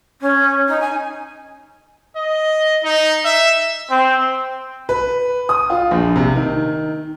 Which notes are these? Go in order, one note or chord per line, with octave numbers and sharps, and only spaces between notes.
C#4
D#4
G#5
D#5
D#4
E5
C4
B4
D#6
F4
A#1
C3
D#3